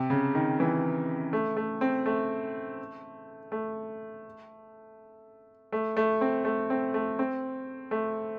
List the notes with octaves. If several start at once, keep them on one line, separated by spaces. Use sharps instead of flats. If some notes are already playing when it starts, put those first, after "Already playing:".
Already playing: C3
C#3
D#3
E3
A3
A3
C4
A3
A3
A3
A3
C4
A3
C4
A3
C4
A3